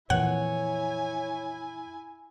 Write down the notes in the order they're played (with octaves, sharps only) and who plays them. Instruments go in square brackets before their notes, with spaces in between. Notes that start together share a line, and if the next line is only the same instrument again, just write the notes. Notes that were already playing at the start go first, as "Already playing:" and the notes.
[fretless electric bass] F2 A#2 E3 [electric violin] E4 G#5 [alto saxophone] C#5 [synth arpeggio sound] F#5